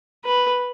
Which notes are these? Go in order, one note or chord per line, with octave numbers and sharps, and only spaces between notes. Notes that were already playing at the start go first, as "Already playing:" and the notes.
B4